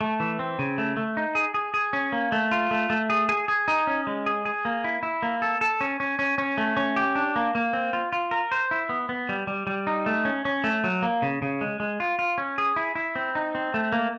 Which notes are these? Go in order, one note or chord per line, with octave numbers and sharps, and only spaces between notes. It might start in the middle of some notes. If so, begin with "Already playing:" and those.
A3
E3
C4
C#3
A3
A3
D#4
G#4
G#4
G#4
C#4
A#3
A3
F4
A3
A3
G#4
G#4
G#4
D#4
C#4
G#3
G#4
G#4
A#3
E4
E4
A#3
A4
A4
C#4
C#4
C#4
C#4
A3
C#4
G4
D4
A#3
A#3
C4
F4
F4
A#4
C5
E4
B3
B3
G3
G3
G3
D#4
A3
C#4
C#4
A3
F#3
A#3
C#3
C#3
G#3
G#3
F4
F4
C#4
G#4
E4
E4
C4
D#4
C4
A3
A#3